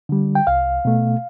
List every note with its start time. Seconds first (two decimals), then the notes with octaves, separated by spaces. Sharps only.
0.09 D3 G3
0.35 G5
0.47 C2 F5
0.85 B2 A3